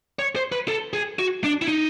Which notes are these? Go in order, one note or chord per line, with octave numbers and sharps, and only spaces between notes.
C#5
C5
B4
A4
G#4
F#4
D4
E4
D#4